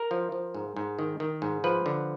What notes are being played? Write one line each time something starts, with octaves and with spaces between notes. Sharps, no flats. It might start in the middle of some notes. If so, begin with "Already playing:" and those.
Already playing: A#4
F3
F3
G#2
G#2
D#3
D#3
G#2
F3 B4
D3